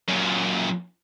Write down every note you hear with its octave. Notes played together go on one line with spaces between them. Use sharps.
F#2 A#2